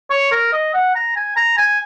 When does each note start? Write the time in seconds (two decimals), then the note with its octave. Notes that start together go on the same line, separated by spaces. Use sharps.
0.10 C#5
0.32 A#4
0.53 D#5
0.74 F#5
0.95 A#5
1.16 G#5
1.37 A#5
1.58 G#5